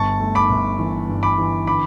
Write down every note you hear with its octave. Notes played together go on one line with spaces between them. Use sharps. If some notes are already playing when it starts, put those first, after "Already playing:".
Already playing: G1 A5 C#6
A3
B5 D6
G1
E3
G2
B5 D6
E3
D3 B5 D6